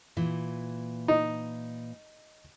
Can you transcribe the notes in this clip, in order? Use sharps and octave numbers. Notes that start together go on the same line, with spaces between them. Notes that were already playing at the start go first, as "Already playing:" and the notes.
A#2 E3
D#4